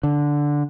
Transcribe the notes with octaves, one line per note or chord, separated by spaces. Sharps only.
D3